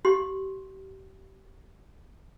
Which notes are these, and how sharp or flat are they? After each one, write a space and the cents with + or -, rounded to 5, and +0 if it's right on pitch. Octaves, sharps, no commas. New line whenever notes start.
G4 -30 C6 +0